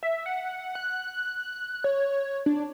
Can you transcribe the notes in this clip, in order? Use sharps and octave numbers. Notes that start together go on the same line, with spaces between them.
E5
F#5
F#6
C#5
D4